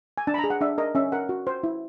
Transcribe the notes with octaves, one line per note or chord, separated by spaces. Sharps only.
G#5
D4 A5
B5
A#5
G#4
F#5
D4 E5
A#4 D#5
C#4 E5
A#4 F#5
F#4
C5
E4